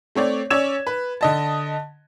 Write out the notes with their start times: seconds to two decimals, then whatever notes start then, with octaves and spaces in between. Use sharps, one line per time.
0.15 A3 C4 C#5 D5
0.50 C#4 C#5 D5 E6 G#6 E7
0.87 B4
1.21 D3 D#5 A5